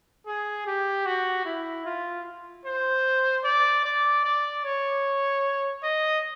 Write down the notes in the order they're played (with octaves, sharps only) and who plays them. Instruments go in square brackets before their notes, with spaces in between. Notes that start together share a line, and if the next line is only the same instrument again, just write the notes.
[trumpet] G#4
G4
F#4
E4
F4
C5
D5
D5
D5
C#5
D#5